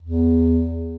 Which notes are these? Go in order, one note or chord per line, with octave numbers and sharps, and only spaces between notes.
E2